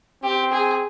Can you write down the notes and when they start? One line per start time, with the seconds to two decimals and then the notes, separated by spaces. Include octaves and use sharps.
0.23 C4 G4
0.52 G#4